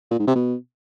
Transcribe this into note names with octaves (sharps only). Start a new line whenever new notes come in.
A#2
G#2
C3
B2